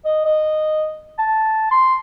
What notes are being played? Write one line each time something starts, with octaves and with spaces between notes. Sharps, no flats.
D#5
D#5
A5
C6